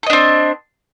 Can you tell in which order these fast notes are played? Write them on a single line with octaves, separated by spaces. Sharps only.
A4 D#5 D4 C4